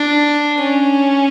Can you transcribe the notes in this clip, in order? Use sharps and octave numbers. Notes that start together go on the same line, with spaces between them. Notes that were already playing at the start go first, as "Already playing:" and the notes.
Already playing: D4
C#4